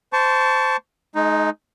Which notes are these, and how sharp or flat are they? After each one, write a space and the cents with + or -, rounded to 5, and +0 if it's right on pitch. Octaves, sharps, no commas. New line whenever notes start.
C5 -10 A5 +0 C#6 +30
G#3 +35 D#4 +0